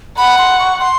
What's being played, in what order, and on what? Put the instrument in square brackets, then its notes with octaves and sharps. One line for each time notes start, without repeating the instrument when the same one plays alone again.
[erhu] F#5 [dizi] B5
[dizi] C6
C#6
C6